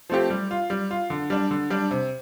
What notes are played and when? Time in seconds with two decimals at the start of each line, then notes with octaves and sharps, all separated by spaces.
0.09 F3 A3 C4 G4
0.30 G3
0.51 F4
0.70 G3
0.91 F4
1.10 D3
1.30 G3 D4
1.51 D3
1.70 G3 D4
1.91 C3